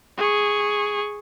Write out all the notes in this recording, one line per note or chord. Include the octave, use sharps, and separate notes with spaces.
G#4 C#6